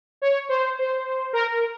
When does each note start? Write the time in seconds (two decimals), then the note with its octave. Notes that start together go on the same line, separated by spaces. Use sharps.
0.22 C#5
0.49 C5
0.79 C5
1.33 A#4
1.47 A#4